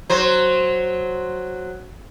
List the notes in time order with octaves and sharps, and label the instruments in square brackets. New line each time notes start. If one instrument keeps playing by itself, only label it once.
[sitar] F#3 C5